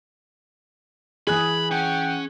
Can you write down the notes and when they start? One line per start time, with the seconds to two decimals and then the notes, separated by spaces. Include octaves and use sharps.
1.27 E3 G#4 B5 F#6 G#6
1.71 C#4 F#5 G5